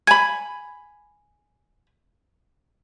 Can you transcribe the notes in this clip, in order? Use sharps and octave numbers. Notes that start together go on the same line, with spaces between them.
G#5 B5 G#6